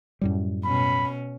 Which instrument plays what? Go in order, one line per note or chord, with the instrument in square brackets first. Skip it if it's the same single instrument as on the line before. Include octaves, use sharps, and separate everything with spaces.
[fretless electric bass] F#2 A2 G3
[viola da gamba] B2 C#4 [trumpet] B5